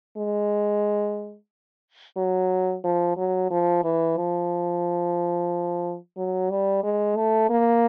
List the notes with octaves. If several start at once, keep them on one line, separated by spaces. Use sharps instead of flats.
G#3
F#3
F3
F#3
F3
E3
F3
F#3
G3
G#3
A3
A#3